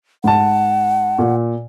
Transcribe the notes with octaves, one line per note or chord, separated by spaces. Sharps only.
G#2 F#5 A5
A#2